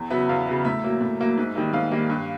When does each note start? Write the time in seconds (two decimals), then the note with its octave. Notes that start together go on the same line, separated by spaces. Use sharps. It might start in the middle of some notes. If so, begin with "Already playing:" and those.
Already playing: E2
0.10 C#3 F#3 B3 E5
0.29 E2 F5
0.48 C#3 F#3 B3
0.65 A2 E5
0.83 F#3 A#3
1.01 A2
1.20 F#3 A#3
1.38 G#2
1.55 D#3 G3 A#3
1.73 G#2 F5
1.92 D#3 G3 A#3
2.10 G2